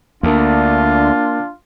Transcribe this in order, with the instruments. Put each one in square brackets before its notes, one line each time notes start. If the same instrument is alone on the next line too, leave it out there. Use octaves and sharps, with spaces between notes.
[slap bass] D2 [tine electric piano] A#3 A#4 [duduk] D4 [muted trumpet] F4